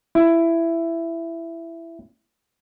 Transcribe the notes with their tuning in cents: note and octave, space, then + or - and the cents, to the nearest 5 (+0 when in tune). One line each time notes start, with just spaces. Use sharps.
E4 +15